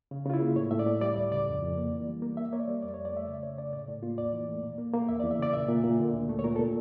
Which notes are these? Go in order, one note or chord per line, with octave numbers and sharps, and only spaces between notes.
C#3
C#3 F4
E4
A#3
A2 C#5
A2 E5
D5
A2
G3 D5
D2 D5
C#3 D5
F2
F2
A#3
E3
G3
A#3
A#3 E5
A#3 C#5
D5
G3
F2 D5
C#5
F2
D5
A3 E5
C#3 D5
C#3 C#5
C#3 D5
A2 D5
A2
A#3 F4
E2 D5
E3
A3
A#2
A#3
A#3
E2 E5
D5
E2
E5
C#3 D5
A#2 E5
A#2
A#2
D3
D2
A3
C#5
A#2 A#4
A#2 A4